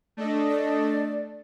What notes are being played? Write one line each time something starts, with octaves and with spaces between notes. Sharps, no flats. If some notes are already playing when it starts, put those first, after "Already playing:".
A3 D4 A4 D#5
D5